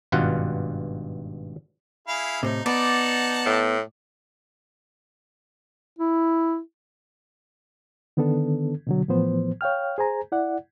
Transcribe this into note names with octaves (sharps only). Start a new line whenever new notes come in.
G#1 G2 B2 F4 F#5
E4 G#4 F5
A2 C3 D#4
B3 D#4 D5 F#5 A5
A2
E4
D3 D#3 B3 D4 A4
B2 D3 F#3
A2 E3 F3 B3 C5
C#5 F5 G5 F6
G#4 C5 G#5 A#5
E4 D5 F#5